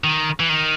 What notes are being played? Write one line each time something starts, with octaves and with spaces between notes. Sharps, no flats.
D#3
E3
D#3